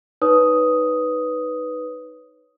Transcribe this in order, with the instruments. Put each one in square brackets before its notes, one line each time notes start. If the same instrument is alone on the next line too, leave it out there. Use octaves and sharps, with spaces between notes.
[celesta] D#4 B4 C#5 D#6